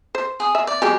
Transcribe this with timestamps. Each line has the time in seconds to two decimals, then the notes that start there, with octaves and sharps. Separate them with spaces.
0.15 C5
0.40 G#4 D#6
0.55 E5
0.67 D5
0.82 F#3 G#3 G4 G#5